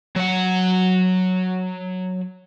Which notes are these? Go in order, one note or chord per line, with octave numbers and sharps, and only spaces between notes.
F#3 F#5